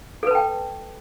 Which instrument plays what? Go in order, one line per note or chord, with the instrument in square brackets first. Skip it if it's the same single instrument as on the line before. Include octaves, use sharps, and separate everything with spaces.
[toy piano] A4
B4
A5
G5